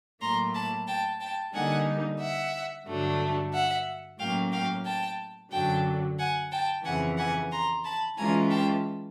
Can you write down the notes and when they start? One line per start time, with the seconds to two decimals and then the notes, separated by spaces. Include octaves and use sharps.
0.21 A2 F#3 A#3 A#5 C6
0.55 A5 B5
0.87 G5 A5
1.20 G5 A5
1.53 D3 G3 A#3 D#4 F#5 G#5
2.20 E5 F#5
2.86 G2 D3 F#3 A3 D4
3.53 E5 F#5
4.19 A2 F#3 A#3 C#4 F5 G5
4.52 F5 G5
4.85 G5 A5
5.51 F#2 D3 F#3 G5 A5
6.18 F#5 G#5
6.51 G5 A5
6.84 F2 C#3 E3 F#5 G#5
7.17 F#5 G#5
7.52 A#5 C6
7.84 A5 B5
8.17 E3 G#3 C#4 F4 G#5 A#5
8.50 G5 A5